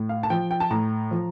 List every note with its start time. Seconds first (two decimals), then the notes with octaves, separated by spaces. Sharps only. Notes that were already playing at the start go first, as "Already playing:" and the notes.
Already playing: A2
0.09 F5
0.23 A5
0.30 F3 G5
0.51 G5
0.60 A5
0.71 A2 A#5
1.11 F3